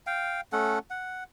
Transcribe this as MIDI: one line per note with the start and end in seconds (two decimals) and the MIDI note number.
0.07 0.41 77
0.07 0.41 79
0.52 0.79 57
0.52 0.79 61
0.52 0.79 69
0.52 0.79 78
0.90 1.24 78